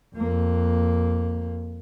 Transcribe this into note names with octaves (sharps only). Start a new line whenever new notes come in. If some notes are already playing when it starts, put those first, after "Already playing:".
F2 A#3